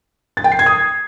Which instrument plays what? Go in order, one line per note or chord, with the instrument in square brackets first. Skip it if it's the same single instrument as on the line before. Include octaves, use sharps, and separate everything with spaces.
[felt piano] A6
G5
C7
G#6
D#6